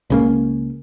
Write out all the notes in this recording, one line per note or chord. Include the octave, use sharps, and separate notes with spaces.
C#2 C#3 A#3